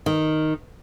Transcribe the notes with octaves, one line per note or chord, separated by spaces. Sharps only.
D#3